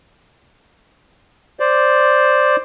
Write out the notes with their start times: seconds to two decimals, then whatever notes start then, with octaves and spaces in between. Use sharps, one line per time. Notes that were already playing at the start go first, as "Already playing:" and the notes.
1.60 C5 D5